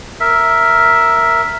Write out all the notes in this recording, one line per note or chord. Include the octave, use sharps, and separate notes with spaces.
A#4 E5